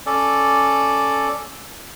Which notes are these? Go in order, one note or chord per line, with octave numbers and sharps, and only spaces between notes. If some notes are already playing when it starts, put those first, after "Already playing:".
C#4 A4 D5